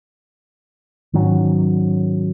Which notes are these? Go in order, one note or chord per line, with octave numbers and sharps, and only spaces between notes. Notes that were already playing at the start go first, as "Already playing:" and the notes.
G#2 D#3 F#3 C#4